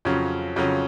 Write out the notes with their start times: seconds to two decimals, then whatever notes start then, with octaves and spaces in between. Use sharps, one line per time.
0.05 F2 C#3 F#3 C#4
0.56 F2 C#3 F#3 C#4